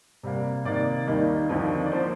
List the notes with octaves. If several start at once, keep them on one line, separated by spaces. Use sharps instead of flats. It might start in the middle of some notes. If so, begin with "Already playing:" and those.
C3 G3 A#3
C3 D#3 A#3 D#4 D5
D#2 D#3 G3 A#3 D#4 D#5
D#2 D3 F3 C4 D#4
D5
F3 A#3 C5